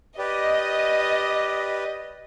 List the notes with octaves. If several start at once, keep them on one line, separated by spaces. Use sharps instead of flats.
G4 B4 D5 D#5